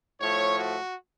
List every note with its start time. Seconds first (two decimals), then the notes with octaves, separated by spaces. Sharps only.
0.20 A2 F3 A3 C#5
0.56 F#4